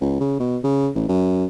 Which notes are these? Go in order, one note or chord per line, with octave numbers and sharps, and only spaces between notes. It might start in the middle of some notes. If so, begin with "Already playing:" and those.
C#2
C#3
B2
C#3
A1
F#2